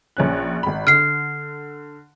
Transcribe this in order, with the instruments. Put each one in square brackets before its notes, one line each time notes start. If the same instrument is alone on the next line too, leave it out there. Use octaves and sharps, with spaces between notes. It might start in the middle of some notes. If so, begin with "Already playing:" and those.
[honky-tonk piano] A#1 C#4 F#6
G#1 B5
[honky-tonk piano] D3 [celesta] F6 C7